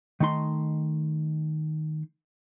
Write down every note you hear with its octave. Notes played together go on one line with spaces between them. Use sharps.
D#3 A3 D#4 C6